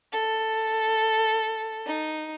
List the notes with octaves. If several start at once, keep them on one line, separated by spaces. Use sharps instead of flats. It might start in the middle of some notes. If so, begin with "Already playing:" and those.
A4
D#4